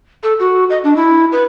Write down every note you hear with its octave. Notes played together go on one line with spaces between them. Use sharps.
A4
F#4
D#5
D4
E4
B4